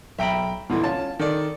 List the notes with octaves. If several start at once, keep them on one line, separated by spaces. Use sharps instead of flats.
B1 E5 G5 A#5 B5 D7
D#1 C2 B2 D3 E3 C6
C#4 F4 A5
D#3 A4 D5